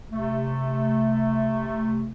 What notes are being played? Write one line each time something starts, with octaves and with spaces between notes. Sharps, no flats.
C3 A3